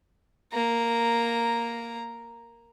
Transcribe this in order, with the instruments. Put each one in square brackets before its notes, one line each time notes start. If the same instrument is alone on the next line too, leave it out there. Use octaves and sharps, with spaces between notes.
[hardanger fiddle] A#3 A#5